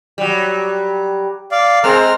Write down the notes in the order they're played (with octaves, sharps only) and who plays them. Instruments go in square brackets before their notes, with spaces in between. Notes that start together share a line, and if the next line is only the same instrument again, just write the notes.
[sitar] F#3 G3
[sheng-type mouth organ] D5 F5
[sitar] G#3 C4 [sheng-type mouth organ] A#4 F6